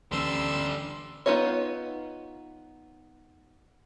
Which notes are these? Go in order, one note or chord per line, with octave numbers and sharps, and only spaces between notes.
D2 D3 E3 G3 C#4 C6 E6
B3 D#4 F4 A#4 C#5